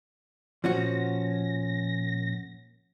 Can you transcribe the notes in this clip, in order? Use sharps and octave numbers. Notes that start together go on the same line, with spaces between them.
A#2 F3 C#4 F#4 A#6